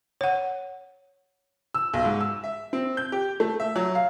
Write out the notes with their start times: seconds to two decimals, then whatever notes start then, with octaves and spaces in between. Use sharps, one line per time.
0.21 C#5 F#5
1.74 E6
1.94 B1
2.05 G#2
2.21 E6
2.44 E5
2.73 C4
2.97 G6
3.12 G4
3.40 A3
3.60 E5
3.76 F#3
3.95 F5